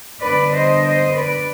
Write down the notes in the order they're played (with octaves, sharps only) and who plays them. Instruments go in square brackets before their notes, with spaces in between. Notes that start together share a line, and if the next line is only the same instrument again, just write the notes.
[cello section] D3 G3 B3 D4 B4 D5
C5 D#5
C5 D#5
B4 D5